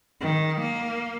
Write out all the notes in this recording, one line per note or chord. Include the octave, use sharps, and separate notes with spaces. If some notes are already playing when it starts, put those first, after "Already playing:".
D#3
A#3